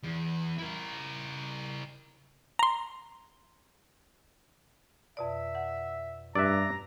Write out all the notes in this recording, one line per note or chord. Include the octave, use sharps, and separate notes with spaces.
E2
E4 A#4
A#5 C6
F2 B2 D5 E5
F#5
G2 D5 E5 A#5 E6 F#6